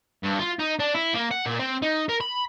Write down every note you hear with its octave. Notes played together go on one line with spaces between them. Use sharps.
G2
F4
D#4
D4
E4
A#3
F#5
A#2
C4
D#4
A#4
B5